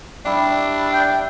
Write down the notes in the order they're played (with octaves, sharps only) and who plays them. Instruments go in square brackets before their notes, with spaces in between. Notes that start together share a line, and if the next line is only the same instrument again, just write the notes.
[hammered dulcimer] G3 E4 G4 [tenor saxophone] D4
[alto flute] G5